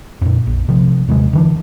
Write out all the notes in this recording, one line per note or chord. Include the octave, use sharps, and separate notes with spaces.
F2 A#2
A#1
C3 F3
D#2 C3 F#3 G#3
D3 E3 D4